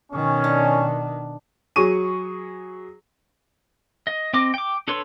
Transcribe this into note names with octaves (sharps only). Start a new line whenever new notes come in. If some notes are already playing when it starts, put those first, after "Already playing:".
B2 D#3 C#4
D4
F#3 G#4 C#6 D#7
D#5
C4 D#5 D6
G5 D6
D4 A4 B4 C#5 C6